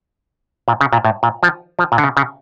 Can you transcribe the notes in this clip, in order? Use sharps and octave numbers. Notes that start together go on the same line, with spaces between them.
A#2
C#3
A#2
A2
A#2
F3
F3
A#2
D3
C#3
C#3